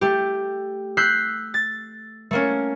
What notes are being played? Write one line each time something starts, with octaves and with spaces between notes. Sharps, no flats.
A3 G4
E6 F#6 G6 B6 C7
A6
A3 A#3 C#4